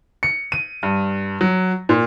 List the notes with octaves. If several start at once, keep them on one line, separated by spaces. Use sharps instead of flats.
C#7
D#7
G2
F#3
A#2